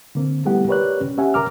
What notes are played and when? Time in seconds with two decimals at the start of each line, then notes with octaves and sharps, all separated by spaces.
0.15 D3 A#3 C4
0.45 G3 A3 B3 E4 G4 F#5
0.68 G4 A#4 B4 C#5 D5 F#6
1.00 C#4
1.18 A#3 C#4 G4 E5 F#5 G#5
1.34 A#4 A#5 D6 F6